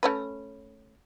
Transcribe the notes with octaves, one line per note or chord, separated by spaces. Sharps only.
A3 C#4 B4